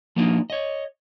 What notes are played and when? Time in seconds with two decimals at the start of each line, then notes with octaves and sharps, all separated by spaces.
0.16 F3 A#3 B3 D4 D#4 F4
0.50 C#5 D#5